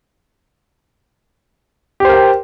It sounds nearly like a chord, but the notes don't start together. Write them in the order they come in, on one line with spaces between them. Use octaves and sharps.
G4 C5 A#4 G5